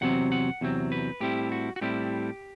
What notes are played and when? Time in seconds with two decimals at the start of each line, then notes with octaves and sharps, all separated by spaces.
0.01 E2 C3 F#3 C4 F#5
0.32 F#5
0.61 E2 C3 F#3 C4
0.92 B4
1.21 A2 G3 C4 E4 G4
1.52 F#4
1.76 F#4
1.81 A2 G3 C4 E4 G4